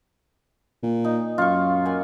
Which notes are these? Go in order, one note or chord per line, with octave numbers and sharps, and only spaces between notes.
A#2
D#4
F#2 F4 C#6
A#3 F#5 G#5